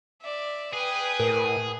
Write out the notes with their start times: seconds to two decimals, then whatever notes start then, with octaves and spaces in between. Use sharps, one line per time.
0.22 D5 E5
0.73 G#4 B4 G5
1.20 A2 A#4